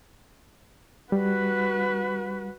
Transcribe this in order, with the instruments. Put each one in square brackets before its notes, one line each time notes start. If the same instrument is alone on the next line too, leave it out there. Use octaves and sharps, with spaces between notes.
[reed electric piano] G3 [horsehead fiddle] F#4 B4